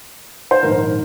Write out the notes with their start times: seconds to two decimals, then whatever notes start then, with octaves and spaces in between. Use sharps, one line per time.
0.51 C5
0.63 A#1 G#2 D#3 A#4